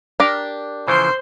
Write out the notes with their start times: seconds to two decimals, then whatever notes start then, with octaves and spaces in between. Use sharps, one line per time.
0.20 D4 G4 A#4
0.88 C#3 E3 F3 C5 C6